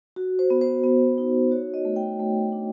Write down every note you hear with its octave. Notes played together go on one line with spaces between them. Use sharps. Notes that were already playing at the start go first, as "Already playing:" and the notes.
F#4
C5
B3
C5
B3
D#4
F#4 C#5
D#5
A3
G5
A3
D4